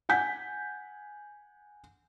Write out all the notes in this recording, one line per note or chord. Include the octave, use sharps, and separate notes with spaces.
F#5 G#5 G6 B6